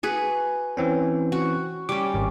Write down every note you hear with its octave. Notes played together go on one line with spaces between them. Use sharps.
F#4 G#4 B4
E3 C4 C#4
F#4
G3 C#4 D6
G#1